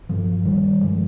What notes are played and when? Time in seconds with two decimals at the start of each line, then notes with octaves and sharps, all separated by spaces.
0.09 G2 F3
0.45 D#3 G3
0.81 G2 F3 G#3